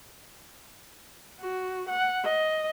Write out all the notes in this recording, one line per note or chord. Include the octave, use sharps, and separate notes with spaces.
F#4
F#5
D#5